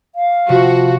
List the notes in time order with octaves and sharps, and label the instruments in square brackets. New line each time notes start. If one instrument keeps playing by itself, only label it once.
[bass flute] F5
[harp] C3 [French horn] F3 [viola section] F#4